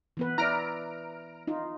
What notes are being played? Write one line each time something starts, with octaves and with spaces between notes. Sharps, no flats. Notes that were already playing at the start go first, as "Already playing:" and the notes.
E3 B3 B4
E4 D5 A#5 F6 D7
D#4 F4